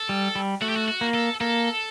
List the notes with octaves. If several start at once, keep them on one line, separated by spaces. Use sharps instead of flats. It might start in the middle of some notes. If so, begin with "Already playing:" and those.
Already playing: A4
G3
G3
A3 F#4
G4
F#4
F#4
A#3
A4
A#3 A4